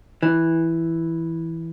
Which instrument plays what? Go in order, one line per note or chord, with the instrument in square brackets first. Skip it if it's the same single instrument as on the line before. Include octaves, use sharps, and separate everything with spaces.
[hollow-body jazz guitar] E3